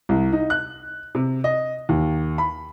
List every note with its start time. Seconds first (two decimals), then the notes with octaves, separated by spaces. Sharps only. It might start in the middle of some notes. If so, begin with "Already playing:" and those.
0.09 C2
0.33 D#4
0.50 F#6
1.15 C3
1.44 D#5
1.89 D#2
2.38 B5